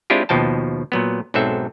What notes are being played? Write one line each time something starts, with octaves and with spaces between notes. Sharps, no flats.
G#3 C4 D4 E4 F4 G4
D#2 B2 F3 G5 A5
A#2 F#3 B3
B1 G#2 F#3 C4 A4 E5